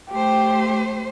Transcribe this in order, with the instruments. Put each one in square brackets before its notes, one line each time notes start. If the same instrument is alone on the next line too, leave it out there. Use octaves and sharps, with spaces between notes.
[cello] A3 C5 [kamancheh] G4